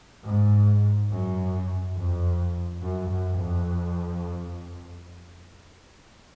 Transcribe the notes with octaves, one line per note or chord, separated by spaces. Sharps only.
G#2
F#2
F2
F#2
F#2
F2